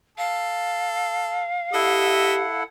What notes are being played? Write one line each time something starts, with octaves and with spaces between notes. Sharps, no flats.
A4 F5
E4 G4 A4 D#5 E5 F#5